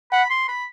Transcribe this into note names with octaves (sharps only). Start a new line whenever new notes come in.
F#5 B5
C6
B5